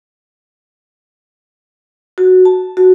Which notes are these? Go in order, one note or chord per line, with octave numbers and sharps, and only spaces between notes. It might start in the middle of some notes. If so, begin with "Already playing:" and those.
F#4
A5
F#4